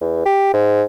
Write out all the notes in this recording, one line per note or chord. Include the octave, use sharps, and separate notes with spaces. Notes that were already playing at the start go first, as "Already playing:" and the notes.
E2
G4
G#2